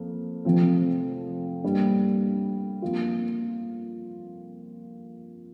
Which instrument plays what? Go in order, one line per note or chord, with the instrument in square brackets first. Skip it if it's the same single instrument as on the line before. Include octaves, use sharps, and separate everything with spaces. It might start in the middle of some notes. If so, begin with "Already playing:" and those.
Already playing: [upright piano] F2 A#3
F1 F2 F3 C4
G2 G3 A#3
F2 F3 A#3 F4